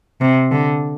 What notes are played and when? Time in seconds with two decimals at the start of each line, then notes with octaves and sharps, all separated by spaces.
0.21 C3
0.51 D3